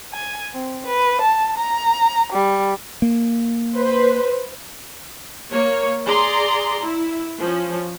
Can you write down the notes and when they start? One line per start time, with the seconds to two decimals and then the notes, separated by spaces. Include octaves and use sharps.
0.13 G#5
0.53 C4
0.87 B4
1.21 A5
1.57 A#5
2.32 G3
3.02 A#3
3.76 B4 C5
5.52 A#3 C#5
6.06 G#4 D5 A#5 C6
6.83 E4
7.39 F3 C#4